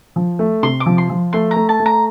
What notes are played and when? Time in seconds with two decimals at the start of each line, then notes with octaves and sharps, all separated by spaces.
0.16 F3
0.39 A3
0.63 C3 C6
0.80 D6
0.86 F3
0.98 C6
1.10 F3
1.33 A3 C6
1.51 A#5
1.56 A3
1.69 A5
1.80 A3
1.86 A#5